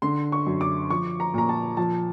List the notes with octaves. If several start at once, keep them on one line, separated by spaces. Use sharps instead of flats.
D3 C6
C#6
F#2
D6
F3 C#6
A#5
A#2 A#5
A5
F3 A5